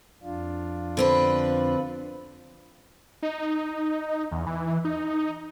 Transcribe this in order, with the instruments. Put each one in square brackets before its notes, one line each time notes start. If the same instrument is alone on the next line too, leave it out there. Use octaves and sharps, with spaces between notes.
[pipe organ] F2 D4 F4
[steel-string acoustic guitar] D3 C4 B4
[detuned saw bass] D#4
E2
E3
D#4